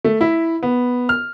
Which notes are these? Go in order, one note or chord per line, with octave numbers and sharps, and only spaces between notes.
A3
E4
B3
F6